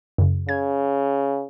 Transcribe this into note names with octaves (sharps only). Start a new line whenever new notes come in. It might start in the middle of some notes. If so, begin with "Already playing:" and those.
F#2 C#3
C#3 G#6